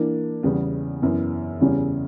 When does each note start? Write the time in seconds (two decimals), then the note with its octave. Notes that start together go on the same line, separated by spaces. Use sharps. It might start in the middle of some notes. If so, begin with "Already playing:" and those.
Already playing: E3 A#3 D4
0.43 E2 C#3 E3 G3 B3
1.02 F#2 E3 B3
1.60 E2 C#3 G3 C#4